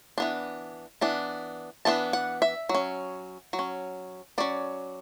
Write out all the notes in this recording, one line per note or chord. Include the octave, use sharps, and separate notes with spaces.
E3 B3 D4
E3 B3 D4
E3 B3 D4 A5
F#5
E5
F#3
C#4
F#3
C#4
F#3 C#4 D5